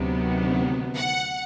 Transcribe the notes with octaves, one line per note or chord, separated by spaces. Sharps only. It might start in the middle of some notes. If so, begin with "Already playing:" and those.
Already playing: D2 C3 D#3 F#3 B3
F#5